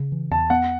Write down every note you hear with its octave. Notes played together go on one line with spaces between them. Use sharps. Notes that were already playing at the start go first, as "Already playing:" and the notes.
Already playing: C#3
E3
E2 A5
B3 F#5